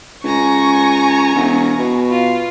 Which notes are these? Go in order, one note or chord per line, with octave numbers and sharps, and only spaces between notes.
C#2 G#5 A#5 C#6
E1
B2
F4